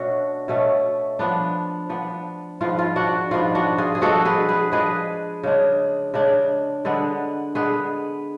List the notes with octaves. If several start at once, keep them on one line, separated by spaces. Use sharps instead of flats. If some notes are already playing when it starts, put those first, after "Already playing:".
Already playing: B2 A3 C#4 D4 F#4
B2 A3 C#4
F3 B3 D4
F3 B3 D4
G#2 F3 B3 D4 F4
F4
D4 F#4
G#2 F3 B3 D4 F4
D4 F#4
F4 G#4
G#4
F3 G#3 D4 F#4 A4
G#4 B4
G#4 B4
F3 G#3 D4 G#4 B4
C#3 G#3 D4
C#3 G#3 D4
D3 G#3 B3 D4
D3 G#3 B3 D4 G#4 B4